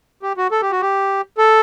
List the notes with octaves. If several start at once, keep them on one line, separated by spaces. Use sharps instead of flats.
G4
F#4
A4
G4
F#4
G4
A4